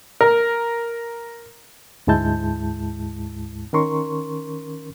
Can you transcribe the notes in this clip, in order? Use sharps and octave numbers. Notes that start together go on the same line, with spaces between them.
A#4
D2 G#2 G#3 E4 A5 G6
D#3 C#4 A#4 C6 C#6